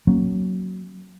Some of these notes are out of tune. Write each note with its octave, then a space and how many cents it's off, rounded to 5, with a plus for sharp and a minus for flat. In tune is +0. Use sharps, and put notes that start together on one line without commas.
F#3 +5 A#3 +0 C#4 -30